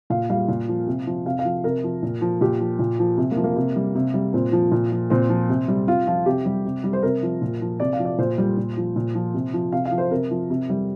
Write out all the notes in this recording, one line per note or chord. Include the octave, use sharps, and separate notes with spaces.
A#2 F5
G3 F5
A#2
F3
C3
F3
C3 F5
F5
F3
C3 A#4
F3
A#2
F3
A#2 G4
F3
A#2
F3
C3
A#3
F3
A#3
C3
G3
C3
G3
A#2 C4
F3
A#2
F3
A#2 C4
F3
C3
G3
C3 F4
F3 F4
C3 G4
G3
C3
G3
C5
C3 A#4
F3
A#2
F3
C3 D5
F5
F3
D5
A#2 C5
G3
A#2
F3
A#2
F3
C3
F3
C3 F5
F5
F3
C5
C3 A#4
F3
C3
G3